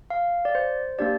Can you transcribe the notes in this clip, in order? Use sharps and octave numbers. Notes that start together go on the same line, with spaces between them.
F5
D5
C5
A#3 D4 G4 D5